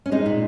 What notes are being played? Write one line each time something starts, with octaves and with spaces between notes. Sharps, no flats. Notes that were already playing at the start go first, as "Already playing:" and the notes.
C#4
G#3 D#4
A#2